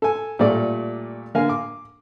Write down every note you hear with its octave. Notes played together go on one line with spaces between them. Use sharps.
A4 G#5
A#2 G3 A3 D5
D3 A#3 F5 G#5
D6